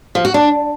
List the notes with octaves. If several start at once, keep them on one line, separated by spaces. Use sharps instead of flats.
F3
F#4
D4